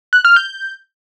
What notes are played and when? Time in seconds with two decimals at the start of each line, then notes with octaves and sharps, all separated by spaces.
0.13 F#6
0.25 F6
0.36 G6